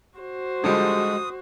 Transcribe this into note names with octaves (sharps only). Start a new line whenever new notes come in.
F#4 C5
D3 F3 G3 G#3 D#6